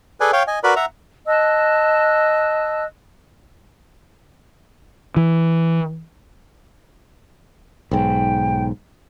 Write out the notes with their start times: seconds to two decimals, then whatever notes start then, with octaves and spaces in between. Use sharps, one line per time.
0.20 G#4 A4 B4 D5 G#5
0.33 C#5 F5 G5
0.47 D#5 G#5
0.64 F#4 A#4 B4 D5 B5
0.76 E5 F#5 A#5
1.27 D#5 A5 E6 F#6
5.16 E3
7.91 B1 G#2 G5